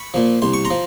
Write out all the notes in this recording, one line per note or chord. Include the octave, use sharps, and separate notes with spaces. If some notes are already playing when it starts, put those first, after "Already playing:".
Already playing: B5 C#6
A#2 F3
C2 C6
C#6
A#5 C6
F3